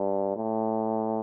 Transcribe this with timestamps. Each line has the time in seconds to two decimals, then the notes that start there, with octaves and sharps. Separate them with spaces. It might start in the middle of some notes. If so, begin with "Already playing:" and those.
Already playing: G2
0.36 A2